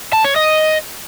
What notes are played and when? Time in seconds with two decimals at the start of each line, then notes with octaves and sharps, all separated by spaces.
0.13 A5
0.24 C#5
0.36 D#5